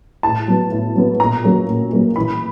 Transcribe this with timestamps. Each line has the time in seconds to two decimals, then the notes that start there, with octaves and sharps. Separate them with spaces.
0.23 A2 A5
0.47 F#3 B3
0.71 A2
0.96 F#3 B3
1.20 A#2 A#5
1.44 F#3 A#3 C#4
1.68 A#2
1.92 F#3 A#3 C#4
2.16 E3 B5